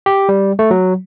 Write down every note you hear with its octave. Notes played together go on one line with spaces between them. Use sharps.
G4
G3
A3
F#3